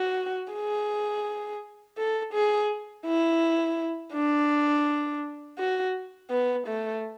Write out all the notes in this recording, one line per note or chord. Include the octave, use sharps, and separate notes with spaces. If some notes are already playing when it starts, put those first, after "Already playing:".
Already playing: F#4
G#4
A4
G#4
E4
D4
F#4
B3
A3